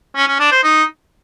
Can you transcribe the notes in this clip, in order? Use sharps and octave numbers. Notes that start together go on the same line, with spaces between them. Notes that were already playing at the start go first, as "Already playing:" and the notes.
C#4
C#4
D4
C5
D#4